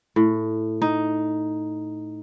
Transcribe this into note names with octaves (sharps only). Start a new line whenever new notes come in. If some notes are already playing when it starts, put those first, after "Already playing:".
A2
D#4